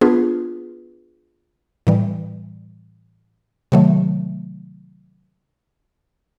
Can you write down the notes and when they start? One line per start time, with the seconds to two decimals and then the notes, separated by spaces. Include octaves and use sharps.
0.01 B3 D4 F4 G#4 B4
1.87 A2 E3 G3
3.72 C3 D#3 F#3 A3